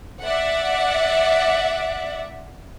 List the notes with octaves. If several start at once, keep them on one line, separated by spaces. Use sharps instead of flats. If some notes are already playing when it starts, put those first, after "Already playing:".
D5 E5 F#5